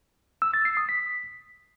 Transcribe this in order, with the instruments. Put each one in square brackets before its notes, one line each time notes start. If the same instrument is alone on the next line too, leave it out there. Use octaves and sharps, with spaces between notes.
[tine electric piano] E6
A6
C7
D#6
B6